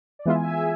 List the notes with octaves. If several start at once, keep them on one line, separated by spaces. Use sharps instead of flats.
D5
E3 G#3 B3 F4 E5
G#5
E5
G#4